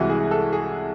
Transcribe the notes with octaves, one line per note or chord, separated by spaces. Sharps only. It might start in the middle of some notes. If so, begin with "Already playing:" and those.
Already playing: C2 C3 E3 G#3 F#4
G#4
A4
G#4